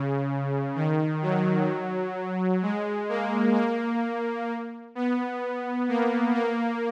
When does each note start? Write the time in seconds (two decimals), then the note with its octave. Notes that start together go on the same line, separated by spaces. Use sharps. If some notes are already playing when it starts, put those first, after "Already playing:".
Already playing: C#3
0.75 D#3
1.22 F#3
2.62 G#3
3.09 A#3
3.55 A#3
4.95 B3
5.89 A#3
6.35 A#3